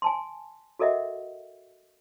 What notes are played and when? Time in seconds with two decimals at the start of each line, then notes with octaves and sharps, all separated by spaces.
0.02 G#5 A5 C6
0.79 F#4 A4 A#4 D#5 E5 F#5